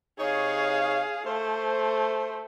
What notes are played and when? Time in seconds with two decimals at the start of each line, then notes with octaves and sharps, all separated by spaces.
0.20 C3 D#4 G#4 C#5 F5
1.26 A3 C5